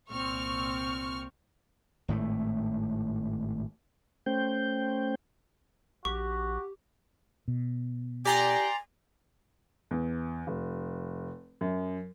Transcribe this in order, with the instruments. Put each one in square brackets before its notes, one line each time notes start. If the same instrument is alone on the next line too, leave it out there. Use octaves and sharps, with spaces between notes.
[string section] C2 A#2 C4 C#6 F6
[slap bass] G#1 A2 A3
[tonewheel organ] A3 C#4 C5 G5 G6
[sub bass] A#1 [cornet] F#4 [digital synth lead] G4 [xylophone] C#6
[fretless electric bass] B2
[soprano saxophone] G4 [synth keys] D5 A#5 C6 [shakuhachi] G#5
[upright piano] E2
F1
F#2